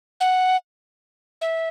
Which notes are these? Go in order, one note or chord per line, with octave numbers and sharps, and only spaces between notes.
F#5
E5